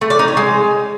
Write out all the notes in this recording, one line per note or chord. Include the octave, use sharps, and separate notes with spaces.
A3
D5
D#4
C#5
G#3